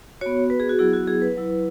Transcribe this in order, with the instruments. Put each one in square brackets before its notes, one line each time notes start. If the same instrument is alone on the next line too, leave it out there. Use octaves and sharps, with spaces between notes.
[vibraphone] B3 F#4 C#5
B4
G#4
F#4
F#3 B3 E4 G#4
F#4
G#4
B4
F#3 E4